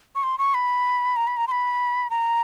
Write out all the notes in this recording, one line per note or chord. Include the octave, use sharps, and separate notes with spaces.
C#6
C6
C#6
B5
A#5
B5
A#5
C6
B5
A#5